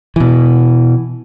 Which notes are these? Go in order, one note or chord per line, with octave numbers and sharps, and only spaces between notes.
B2 E3